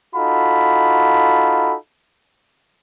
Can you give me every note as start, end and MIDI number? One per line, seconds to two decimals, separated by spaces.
0.15 1.75 63
0.15 1.75 65
0.15 1.75 66
0.15 1.75 69
0.15 1.75 83